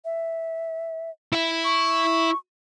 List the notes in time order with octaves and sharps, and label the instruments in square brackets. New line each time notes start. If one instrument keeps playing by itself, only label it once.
[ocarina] E5
[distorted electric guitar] E4 E5
[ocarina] C#6